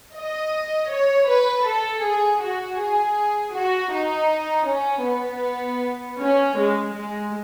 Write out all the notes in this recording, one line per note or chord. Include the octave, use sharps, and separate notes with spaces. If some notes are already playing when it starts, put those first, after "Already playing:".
D#5
C#5
B4
A4
G#4
F#4
G#4
F#4
D#4
C#4
B3
C#4
G#3
G#3